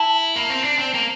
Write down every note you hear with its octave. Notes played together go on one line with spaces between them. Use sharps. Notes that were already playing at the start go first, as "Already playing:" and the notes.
Already playing: E4 A5
A#3
C4
D4
C4
A#3